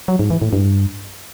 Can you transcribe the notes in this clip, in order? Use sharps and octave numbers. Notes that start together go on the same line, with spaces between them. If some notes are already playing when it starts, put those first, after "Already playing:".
F#3
G#2
E3
A2
G2